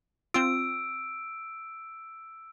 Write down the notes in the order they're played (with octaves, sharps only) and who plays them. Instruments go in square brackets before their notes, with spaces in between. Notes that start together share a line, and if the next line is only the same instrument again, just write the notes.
[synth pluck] C4 F4 [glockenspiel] E6 D7